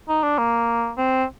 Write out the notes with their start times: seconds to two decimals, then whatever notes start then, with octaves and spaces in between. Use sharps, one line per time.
0.09 D#4
0.23 D4
0.39 A#3
0.97 C4